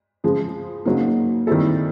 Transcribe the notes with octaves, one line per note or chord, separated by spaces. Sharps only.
C#3 F3 G#3
C#3 F#3 A#3 D#4
D#3 G3 C4 E4 A4